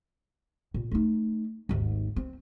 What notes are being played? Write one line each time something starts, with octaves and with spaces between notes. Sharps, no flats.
A#2
A3 D#4
G#1 D#2
C4